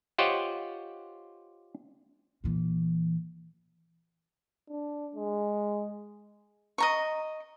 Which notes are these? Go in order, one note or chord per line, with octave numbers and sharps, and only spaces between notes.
F4 G4 C5 C#5 D#5 F#5
A#2 E3
D4
G#3
D#5 A#5 C#6